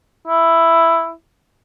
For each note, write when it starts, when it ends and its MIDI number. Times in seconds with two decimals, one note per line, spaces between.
0.27 1.12 64